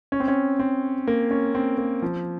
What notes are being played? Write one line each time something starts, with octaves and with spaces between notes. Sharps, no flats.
C#4
C4
C#4
C4
A#3
C#4
C4
A#3
F3